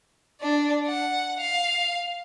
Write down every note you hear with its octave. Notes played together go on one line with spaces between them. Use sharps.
D4 D5
F#5
F5